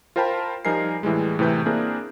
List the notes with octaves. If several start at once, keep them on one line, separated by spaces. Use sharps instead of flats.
F4 A#4 C5 G5 A5 B5
F3 G3 D#4 A#4 G#5 C7
A2 E3 G3 G#3
A2 C3 E3 B4 G6
A#3 C4 D4 E4 G#4 A#4